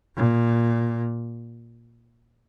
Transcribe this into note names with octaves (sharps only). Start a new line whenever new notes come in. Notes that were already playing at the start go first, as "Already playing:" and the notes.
A#2